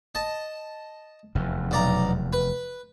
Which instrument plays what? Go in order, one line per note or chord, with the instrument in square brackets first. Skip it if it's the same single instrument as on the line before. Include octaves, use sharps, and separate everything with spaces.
[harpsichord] D#5 A5
[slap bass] F1 E2
[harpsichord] B1 D5 A#5
B4